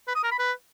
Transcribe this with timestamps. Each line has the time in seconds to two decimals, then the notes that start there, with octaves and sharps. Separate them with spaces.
0.08 B4
0.15 D#6
0.23 A#4
0.31 B5
0.39 B4